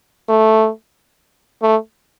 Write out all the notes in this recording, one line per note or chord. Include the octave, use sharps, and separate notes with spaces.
A3
A3